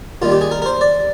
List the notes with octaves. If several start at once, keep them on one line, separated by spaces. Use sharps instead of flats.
D#2 D#3 G3 F4
G4
G#4
A#4
A#4
C5
D5